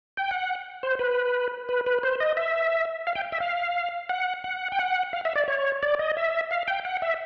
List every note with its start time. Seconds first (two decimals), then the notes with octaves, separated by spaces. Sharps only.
0.17 G5
0.31 F#5
0.83 C5
0.99 B4
1.69 B4
1.86 B4
2.03 C5
2.20 D#5
2.37 E5
3.07 F5
3.15 G5
3.32 E5
3.40 F5
4.09 F#5
4.44 F#5
4.72 G5
4.79 F#5
5.13 F5
5.25 E5
5.35 D5
5.48 C#5
5.83 D5
5.99 D#5
6.17 E5
6.51 F5
6.68 G5
6.85 F#5
7.02 E5